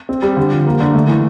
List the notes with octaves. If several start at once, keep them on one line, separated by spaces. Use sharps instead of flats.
C4
G3
D3
F3
A#3
D3
A3
E3